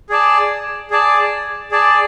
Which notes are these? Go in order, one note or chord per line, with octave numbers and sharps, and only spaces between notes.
G#4 D5 A5
G#4 D5 A5
G#4 D5 A5